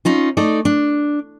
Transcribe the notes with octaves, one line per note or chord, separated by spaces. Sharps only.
C#4 D#4 F4
A3 D#4 D5
D4